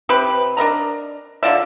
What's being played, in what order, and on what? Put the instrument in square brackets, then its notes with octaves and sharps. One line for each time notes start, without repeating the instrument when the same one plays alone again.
[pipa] C3 C4 G4 B4
D4 A#4 D#5 A#5
D3 F4 D5 E5